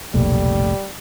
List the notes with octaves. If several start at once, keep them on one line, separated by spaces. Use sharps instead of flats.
F1 B1 A#2 G3 A3